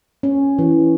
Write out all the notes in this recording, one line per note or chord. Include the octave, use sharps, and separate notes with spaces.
C#4
E3